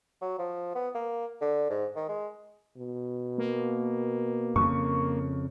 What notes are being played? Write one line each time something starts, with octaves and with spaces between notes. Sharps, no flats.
F#3
F3
B3
A#3
D3
G#2
D#3
G#3
B2
A#3
F2 C#3 C#6